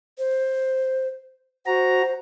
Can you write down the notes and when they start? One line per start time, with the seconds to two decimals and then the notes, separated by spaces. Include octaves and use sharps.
0.18 C5
1.66 F#4 C5 A#5